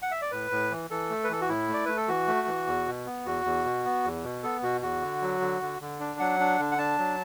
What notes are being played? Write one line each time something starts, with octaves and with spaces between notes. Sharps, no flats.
F#5
E5
D5
A2 B4
A2
E3
E3 A4
A3
B4
E3 A4
F#4
A2 E4
A3 D5
A3 B4
A4
E3 F#4
A3
E3
E2
B2
B3
E2 F#4
E2
B2
B3
E2
B2
B3 A4
B2 F#4
E2 F#4
D3
F#3
D3
D3
D3
D4
F#3 F#5
D4
D3
F#5
D4 A5
F#3